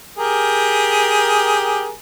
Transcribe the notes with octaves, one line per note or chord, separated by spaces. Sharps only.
G4 G#4 A#4